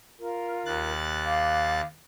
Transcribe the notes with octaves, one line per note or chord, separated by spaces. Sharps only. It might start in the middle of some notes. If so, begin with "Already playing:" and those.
F4 A#4
D#2 F#6 A6
F5 D6